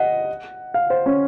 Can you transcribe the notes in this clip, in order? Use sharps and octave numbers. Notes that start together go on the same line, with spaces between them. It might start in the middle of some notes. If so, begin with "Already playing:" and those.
Already playing: D#5 F#5
F5
C5
C#4